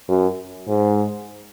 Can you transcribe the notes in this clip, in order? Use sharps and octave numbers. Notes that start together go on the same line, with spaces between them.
F#2
G#2